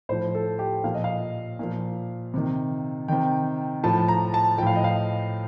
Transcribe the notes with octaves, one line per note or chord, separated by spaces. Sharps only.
A2 F3 C5
A4
G4
A#2 F3 F5
D#5
F5
A#2 F3
C3 D#3
C3 D#3 G5
A2 F3 A5
A#5
A5
A2 F3 F5 G5
D#5
F5